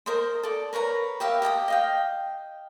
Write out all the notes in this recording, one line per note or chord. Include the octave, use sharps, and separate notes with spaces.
A#4 C5 D#5 C6
A4 D5
A#4 B4 C#5 A#5
G4 A#4 E5 F5
G4 D#5 A5 D#6
D#5 F5 G5